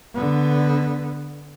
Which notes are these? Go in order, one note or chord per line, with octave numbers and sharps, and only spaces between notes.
D3 B3